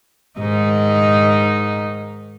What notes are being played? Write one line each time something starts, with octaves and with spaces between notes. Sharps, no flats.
G#2 D#3 D#4